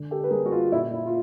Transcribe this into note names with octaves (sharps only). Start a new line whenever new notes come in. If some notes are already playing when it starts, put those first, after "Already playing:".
Already playing: D3
G4 A4
B4
G3 A#3 G#4 A#4
F#4
F4
A#2 E4
E4
F4